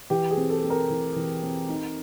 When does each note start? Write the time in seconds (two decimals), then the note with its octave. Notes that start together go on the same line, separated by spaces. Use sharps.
0.10 E3 G4
0.31 G#4
0.37 C4
0.50 A4
0.64 C4
0.70 A#4
0.90 E3
1.16 E3
1.43 C4
1.69 D#4